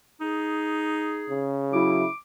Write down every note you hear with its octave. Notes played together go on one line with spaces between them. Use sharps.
D#4 G#4
C#3
F#3 E4 D6